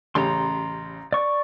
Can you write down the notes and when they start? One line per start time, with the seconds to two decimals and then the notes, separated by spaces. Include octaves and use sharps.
0.15 A1 C#3 G4 A#5 C6
1.12 D5 C#6